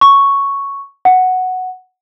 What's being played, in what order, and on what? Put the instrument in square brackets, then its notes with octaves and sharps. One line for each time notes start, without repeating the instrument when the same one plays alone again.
[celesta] C#6
F#5